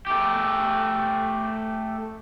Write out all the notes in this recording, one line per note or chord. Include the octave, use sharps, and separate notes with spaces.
A3 G4